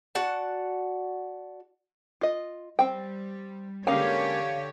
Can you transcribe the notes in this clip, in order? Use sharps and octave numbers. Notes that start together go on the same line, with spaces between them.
F#4 D5 F#5 A5
F4 D#5
G3 C4 G5
D3 G#3 A#3 C#4 G4 C#5 F5